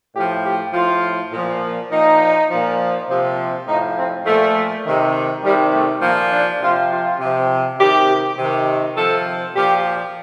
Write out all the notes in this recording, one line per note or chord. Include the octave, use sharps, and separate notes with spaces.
A2 F3 G4
G4
A2 F3 F4
A#2 F3
A#2 F3 D#4
A#2 F3
C3 F3
A2 F3 D#4
C4
A#2 F3 A3
C3 D#3
C3 D#3 G3
A3
A#2 F3 A#3
D4
C3 F3 F4
F4
C3 F3
C3 D#3 G4
C3 D#3
C3 F3 A4
A#2 F3 G4